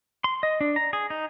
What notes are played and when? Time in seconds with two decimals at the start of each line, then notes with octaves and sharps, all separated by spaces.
0.24 C6
0.43 D#5
0.61 D4
0.76 A#5
0.93 G#4
1.10 D#4